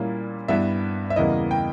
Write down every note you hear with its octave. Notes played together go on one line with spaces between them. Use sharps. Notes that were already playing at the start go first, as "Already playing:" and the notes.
Already playing: A#2 G3 A#3 C#4 E4
G2 G3 B3 E4 E5
E5
E2 C#3 G3 A#3 E4 D#5
G5